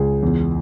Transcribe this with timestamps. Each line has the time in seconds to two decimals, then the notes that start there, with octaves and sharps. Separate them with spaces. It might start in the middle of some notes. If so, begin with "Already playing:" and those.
Already playing: C#2 G#4
0.23 E2